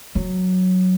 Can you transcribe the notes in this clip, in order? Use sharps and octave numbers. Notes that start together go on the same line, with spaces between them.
F#3